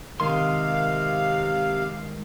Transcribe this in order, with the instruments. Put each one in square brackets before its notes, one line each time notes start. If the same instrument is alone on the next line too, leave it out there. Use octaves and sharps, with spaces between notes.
[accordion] C3 F5 [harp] D#3 [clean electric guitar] G#3 A#4 C6